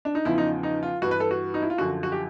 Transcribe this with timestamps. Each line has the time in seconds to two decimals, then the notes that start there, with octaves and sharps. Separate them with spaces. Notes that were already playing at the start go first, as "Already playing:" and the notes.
0.05 D4
0.15 D#4
0.25 E2 C#3 F3 E4
0.38 D#4
0.63 D#4
0.83 F4
1.02 G2 F#4
1.05 E3
1.11 B4
1.20 A4
1.31 F#4
1.54 D#4
1.62 E4
1.70 F4
1.78 F#2 D3 F3 F#4
2.03 F#4
2.12 G4